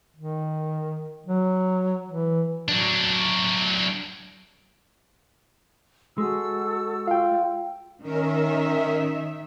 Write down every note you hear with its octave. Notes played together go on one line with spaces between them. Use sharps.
D#3
F#3
E3
F#3 D4
G#3 F#4 A4 E6
F4 F5 G5
D#3 C#4 A#4 E5